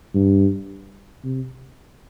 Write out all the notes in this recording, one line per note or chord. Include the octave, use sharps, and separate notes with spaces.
G2
C3